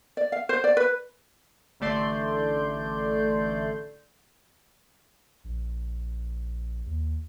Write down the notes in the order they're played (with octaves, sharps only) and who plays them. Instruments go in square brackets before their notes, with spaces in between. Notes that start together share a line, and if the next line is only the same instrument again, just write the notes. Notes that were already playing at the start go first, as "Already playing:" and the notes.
[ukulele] D5
F5
C5
D5
B4
[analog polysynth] A1 D3 A3 D5 C6 G6
[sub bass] A#1
D#2